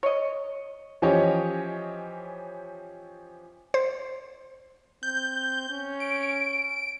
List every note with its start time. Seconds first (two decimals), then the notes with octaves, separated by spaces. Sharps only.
0.03 C#5 D#5
1.02 E3 F3 C#4 G4 C#5 D#5
3.74 C5
5.03 C4 G6
5.70 C#4
6.00 D7